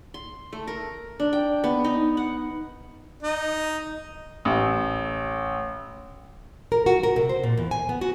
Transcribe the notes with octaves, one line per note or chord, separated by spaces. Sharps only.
C6
A3
A#4
D4
G5
B3
D#4
F#5
D#4
A1
A#4
F#4
A#4
C3
C5
A#2
E2
G#5
B3
F#4